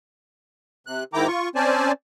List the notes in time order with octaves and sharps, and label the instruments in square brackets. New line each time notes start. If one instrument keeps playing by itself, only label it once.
[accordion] C3 F#6
G#2 D#3 E4 G5 A#5 D6
F4 C#6
C4 C#4 C5 D5 G#5 A5